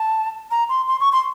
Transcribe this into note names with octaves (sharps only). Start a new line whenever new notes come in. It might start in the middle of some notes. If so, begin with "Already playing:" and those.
Already playing: A5
A#5
C6
C6
C#6
C6